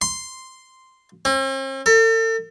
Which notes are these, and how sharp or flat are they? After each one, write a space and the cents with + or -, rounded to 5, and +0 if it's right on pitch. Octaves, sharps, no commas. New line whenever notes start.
C6 -5
C4 +45
A4 +40